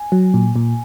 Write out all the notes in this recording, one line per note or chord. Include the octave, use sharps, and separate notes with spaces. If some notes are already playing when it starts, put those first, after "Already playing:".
Already playing: G#5
F#3
A#2
A#2